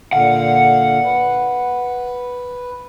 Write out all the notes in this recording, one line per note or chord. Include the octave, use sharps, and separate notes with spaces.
A#2 D3 F5 F#5
B4